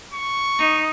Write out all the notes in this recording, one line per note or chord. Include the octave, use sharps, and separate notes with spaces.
C#6
D#4